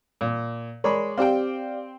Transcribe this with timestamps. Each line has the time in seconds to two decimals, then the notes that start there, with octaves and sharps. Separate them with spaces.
0.21 A#2
0.84 G#3 A#4 C#5 D5 B5
1.18 C4 G4 D5 F5 G5